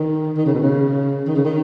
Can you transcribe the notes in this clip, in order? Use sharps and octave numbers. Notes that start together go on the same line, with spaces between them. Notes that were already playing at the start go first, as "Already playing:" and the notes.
Already playing: D#3
D#3
C#3
B2
C#3
D#3
C#3
D#3